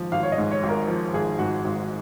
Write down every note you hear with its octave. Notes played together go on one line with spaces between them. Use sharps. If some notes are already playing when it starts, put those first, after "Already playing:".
Already playing: G#1 G#2 F3
G#1 F5
C#5
D#5
G#2
C#5
G#1
A#4
F3
G#1 G#4
G#2 F#4
G#1